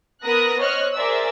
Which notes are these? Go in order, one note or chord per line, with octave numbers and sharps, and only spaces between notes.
B3 A#4 B4 D#6 F#6 A#6
C5 C#5 D#5 F6 F#6
G#4 A#4 C5 D5 E5 E6